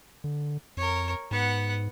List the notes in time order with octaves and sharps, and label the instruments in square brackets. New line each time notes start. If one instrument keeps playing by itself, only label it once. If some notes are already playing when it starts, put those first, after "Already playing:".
[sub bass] D3
[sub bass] F2 [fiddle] A#4 C#5
[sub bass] G#2 [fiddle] B3 F#5